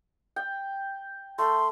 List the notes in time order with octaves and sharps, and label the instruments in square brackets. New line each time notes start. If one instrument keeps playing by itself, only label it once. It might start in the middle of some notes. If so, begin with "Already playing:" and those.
[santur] G5
[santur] A3 [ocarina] C6